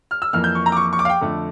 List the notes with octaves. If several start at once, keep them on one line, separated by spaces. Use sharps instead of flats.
F6
E6
F2 E3 A#3 F6
G6
C#6
A#5
D6
C#6
C#6
D6
F5
G5
F2 D3 A3